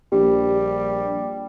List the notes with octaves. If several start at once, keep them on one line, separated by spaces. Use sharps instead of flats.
A#1 G3 G4